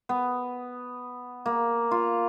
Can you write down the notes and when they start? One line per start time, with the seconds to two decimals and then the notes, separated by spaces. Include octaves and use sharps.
0.09 B3
1.46 A#3
1.91 F4